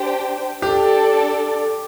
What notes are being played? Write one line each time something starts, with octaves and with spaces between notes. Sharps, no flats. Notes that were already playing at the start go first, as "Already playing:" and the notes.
Already playing: D4 G4 C5 G5
D4 G4 A4 D5